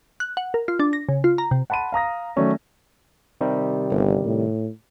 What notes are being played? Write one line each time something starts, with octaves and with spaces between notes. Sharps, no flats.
F#6
F#5
A#4
F4
D4
A#6
C#3
F4
A#5
C3
F#5 A5 B5 C6 D#7
F5 A#5 D#6 A#6
D#3 F#3 A3 C#4 D5
C3 D#3 G3
G1
A2